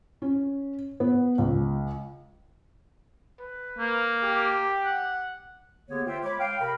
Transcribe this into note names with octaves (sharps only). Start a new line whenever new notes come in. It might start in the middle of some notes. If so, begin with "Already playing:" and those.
C#4
B3
C#2
B4
A#3
G4
F#5
D3 A#3 B3 G4 G#4 C#5
F4 C5 E5 G5
G#3 C#5 B5 D6
F5 G5
C3 A#4 B5